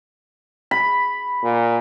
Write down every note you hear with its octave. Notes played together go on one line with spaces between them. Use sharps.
B5
A#2